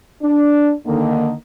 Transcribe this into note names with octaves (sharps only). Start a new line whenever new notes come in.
D4
D3 D#3 A#3